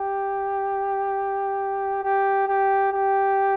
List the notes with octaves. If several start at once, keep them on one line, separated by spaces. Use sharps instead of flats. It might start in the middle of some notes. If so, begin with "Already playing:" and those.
Already playing: G4
G4
G4
G4